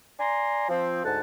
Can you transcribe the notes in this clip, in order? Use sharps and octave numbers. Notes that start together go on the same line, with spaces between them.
D5 G#5 A#5 C6
F3 C4
D2 G#2 F#5 A5